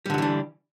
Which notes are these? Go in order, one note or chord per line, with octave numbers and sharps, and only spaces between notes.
D3 E3 F#3 G3 D4